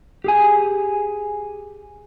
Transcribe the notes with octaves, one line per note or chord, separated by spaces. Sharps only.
G4 G#4 G#5